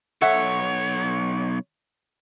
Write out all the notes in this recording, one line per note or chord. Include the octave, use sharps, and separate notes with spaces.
B1 A4 C#5 E5 F#5